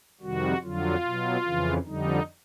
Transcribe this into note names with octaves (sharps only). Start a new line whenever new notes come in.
F2 C3 D#3 G3 F#4
F2 D3 F#3 F4
B2 F#3
F2 C#3 E3
F2 D3 G3 D#4